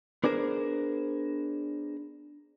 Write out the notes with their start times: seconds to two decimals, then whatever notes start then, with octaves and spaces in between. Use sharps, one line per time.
0.24 B3 D4 G#4 A#4 C5